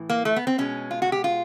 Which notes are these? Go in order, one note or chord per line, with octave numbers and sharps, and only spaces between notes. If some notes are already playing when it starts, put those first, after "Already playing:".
Already playing: A2 E3
A#3
A3
B3
C4
B2 G#3 C#4
F4
F#4
G4
F4